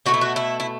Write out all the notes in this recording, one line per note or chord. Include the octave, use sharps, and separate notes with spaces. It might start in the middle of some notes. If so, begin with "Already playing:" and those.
B2 A3 F#4
E4
F#4
E4
E4